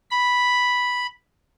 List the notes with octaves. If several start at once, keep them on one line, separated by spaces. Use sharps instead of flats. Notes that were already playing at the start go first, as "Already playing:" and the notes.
B5